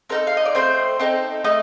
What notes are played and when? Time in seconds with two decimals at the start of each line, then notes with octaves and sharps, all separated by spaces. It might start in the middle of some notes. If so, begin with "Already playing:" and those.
0.09 C4 D#4 A4 A#4
0.27 F5
0.37 D#5
0.45 D5
0.55 A3 C4 C5
1.00 C4 D#4 A4
1.44 A3 D#4 D#5